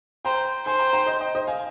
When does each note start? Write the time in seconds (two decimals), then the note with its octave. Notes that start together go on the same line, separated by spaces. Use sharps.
0.25 C5 G5 A#5
0.66 C5 G#5 C6
0.79 G5 A#5
0.93 G5 A#5
1.06 C5 D#5
1.20 D#5 G5
1.35 C5 D#5
1.47 F5 G#5